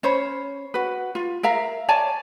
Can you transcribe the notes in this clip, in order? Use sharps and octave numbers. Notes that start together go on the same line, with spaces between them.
C#4 C5 C#5 B5
F#4 B4
F4
A#4 E5 F5 A#5
C#5 D5 G#5 A5